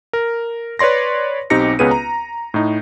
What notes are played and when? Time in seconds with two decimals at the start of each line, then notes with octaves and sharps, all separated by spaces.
0.13 A#4
0.79 B4 C#5 D5 C6 A#6
1.50 B1 C4 D#4 G4 A#6 C#7
1.79 C#2 B3 C#4 G#4 B4 D#7
1.91 A#5
2.54 A2 D#4